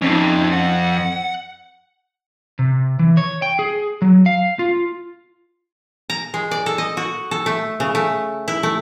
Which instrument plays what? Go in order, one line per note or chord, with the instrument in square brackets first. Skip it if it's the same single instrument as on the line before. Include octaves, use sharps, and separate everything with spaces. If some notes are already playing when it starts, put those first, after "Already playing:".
[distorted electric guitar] F2 [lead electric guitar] C#4 D#4
[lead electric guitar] F#5
[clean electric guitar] C3
E3
C#5
G5
G#4
F#3
F5
F4
[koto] A#5
G#3
D5
A4
D#5
F#4
A4
A3
C#3
A3
E4
A3